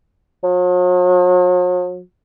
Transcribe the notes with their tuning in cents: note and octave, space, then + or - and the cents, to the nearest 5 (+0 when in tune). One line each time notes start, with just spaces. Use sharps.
F#3 -45